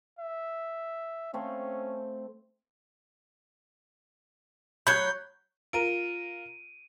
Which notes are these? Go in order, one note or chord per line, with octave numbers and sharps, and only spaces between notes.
E5
A3 C4 C#4 F5
F#3 C#5 B5 F#6 G6
F4 A#4 D7 D#7